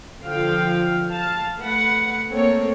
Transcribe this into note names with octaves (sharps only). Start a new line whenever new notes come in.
D3 F3 F5 G5
F5 A5
A3 B4 F#5
A3 A#3 C4 A4 C#5